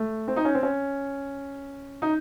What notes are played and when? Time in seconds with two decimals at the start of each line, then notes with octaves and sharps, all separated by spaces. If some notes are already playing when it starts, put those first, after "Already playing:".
Already playing: A3
0.28 C4
0.36 D#4
0.45 C#4
0.55 C4
0.63 C#4
2.02 D#4